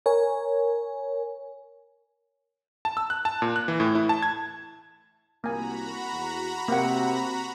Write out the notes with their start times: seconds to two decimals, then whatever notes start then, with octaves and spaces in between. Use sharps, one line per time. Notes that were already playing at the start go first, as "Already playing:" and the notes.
0.06 A#4 C#5 G#5
2.85 A5
2.97 E6
3.10 F#6
3.25 A5
3.42 A#2
3.56 F#6
3.68 E3
3.80 A2
3.95 E4
4.09 A5
4.22 G#6
5.44 C2 A#3 F#4 G#5 A#5 B5
6.12 E2
6.68 C3 A#3 F#5